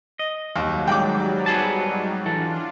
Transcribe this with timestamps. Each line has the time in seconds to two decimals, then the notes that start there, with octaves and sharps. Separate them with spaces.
0.19 D#5
0.56 D#2 G#2 F#3 G3
0.87 D#3 G#3 G5 D6
1.46 B3 G#4 A5
2.26 E3 D4 F4 A4